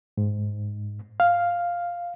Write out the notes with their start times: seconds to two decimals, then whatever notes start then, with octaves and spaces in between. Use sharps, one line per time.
0.18 G#2
1.20 F5